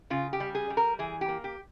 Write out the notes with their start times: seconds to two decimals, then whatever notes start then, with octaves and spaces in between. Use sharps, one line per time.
0.10 C#3 F4
0.33 G4
0.40 G3
0.55 G#4
0.70 G3
0.77 A#4
0.99 E3 G#4
1.21 G4
1.28 A#3
1.44 G4